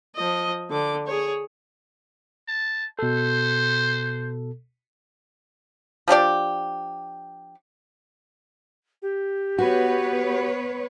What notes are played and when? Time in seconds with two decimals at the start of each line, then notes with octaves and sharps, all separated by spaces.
0.15 F3 D#5
0.71 D3 D6
1.07 G#4 C#5
2.48 A5
2.99 B2 A4 C5
6.08 F3 D4 G4 D5
9.02 G4
9.59 B3 F#4 B4 C#5